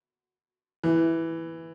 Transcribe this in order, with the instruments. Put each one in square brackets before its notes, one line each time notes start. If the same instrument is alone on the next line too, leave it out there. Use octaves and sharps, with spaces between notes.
[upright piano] E3